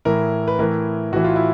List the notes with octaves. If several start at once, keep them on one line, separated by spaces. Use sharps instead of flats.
A2 E3 A#4
B4
A2 E3 A#4
A2 E3 F#4
F4
E4